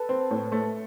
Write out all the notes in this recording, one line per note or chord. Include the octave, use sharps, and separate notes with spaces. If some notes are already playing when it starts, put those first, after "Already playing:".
Already playing: A4 B4
C4
A2
A3